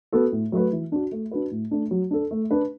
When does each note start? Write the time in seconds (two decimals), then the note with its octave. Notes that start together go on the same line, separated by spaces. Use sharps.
0.13 B3 F#4 A4
0.32 A2
0.52 F#3 A3 F#4 B4
0.72 E3
0.92 D4 F#4
1.12 A3
1.31 D4 F#4 B4
1.51 A2
1.71 A3 D4
1.91 F#3
2.11 D4 A4
2.31 A3
2.51 D4 B4